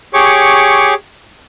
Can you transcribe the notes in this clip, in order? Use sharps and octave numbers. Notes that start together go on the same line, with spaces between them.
G4 G#4 C#5 C#6 D6